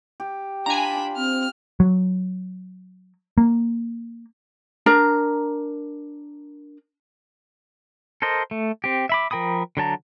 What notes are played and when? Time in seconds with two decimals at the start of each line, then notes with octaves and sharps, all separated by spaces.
0.20 G4
0.66 D4 F4 G#5 A#5 B5
1.17 C4 F6
1.80 F#3
3.38 A#3
4.86 D4 A#4 A#5
8.22 A4 A#4 C5 D#5
8.51 A3
8.84 C4 G4
9.09 E5 B5 D6
9.31 F3 A#4 G5 B5 D#6
9.77 D3 F#3 A5 A#5